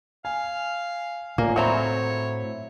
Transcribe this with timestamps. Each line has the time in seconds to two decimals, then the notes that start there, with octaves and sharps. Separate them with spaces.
0.25 F5 G#5
1.38 A2 A#3 F4 D5 G#5
1.56 F#3 C4 C#5 E5 A#5 B5